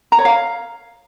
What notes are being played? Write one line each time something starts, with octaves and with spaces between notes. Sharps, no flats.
A#5
C#5
F5